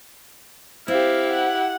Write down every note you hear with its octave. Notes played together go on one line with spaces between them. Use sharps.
C4 E4 G4 F5
F#5